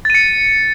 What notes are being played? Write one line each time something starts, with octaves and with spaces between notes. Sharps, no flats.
A6 C#7 D#7